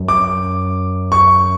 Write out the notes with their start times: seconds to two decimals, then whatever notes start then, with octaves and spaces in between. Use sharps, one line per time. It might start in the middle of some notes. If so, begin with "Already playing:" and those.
Already playing: F#2
0.08 D6
1.12 C#6